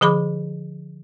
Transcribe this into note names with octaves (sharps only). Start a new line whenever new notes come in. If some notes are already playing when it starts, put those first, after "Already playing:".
D3 F3 G#4 B5 D6